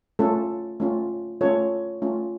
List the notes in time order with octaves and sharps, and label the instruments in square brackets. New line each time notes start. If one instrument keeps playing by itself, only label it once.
[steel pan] A3 C#4 F4 A4
A3 C#4 F4
A3 C#4 F4 A4 C#5
A3 C#4 F4